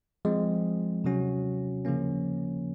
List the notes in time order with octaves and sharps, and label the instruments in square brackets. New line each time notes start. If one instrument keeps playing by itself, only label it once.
[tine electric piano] F3 G#3 C4
C3 F#3 C#4 F#4
C#3 F3 A#3 C#4